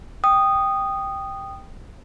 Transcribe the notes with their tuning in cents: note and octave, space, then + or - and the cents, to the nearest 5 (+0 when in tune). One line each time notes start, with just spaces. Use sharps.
G5 +0 D#6 -10